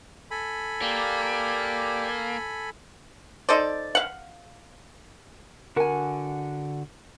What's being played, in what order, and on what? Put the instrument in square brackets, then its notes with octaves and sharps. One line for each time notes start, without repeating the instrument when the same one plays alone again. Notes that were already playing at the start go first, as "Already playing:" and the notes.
[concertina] A4 G#5 B5
[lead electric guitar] A#3 [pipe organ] G4 D5
[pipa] D#4 A4 C5 D5
F5 F#5
[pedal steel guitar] D3 F#4 F#5 [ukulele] A#4 G#5